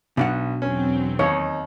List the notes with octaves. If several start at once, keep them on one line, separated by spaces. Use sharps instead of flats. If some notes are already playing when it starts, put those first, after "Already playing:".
B1 B2 D4 F#5
E2 F#3 C4 C#4
D#2 D#4 C#5 D#5